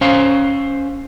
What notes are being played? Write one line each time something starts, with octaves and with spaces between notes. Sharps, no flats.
C#4 C5 F5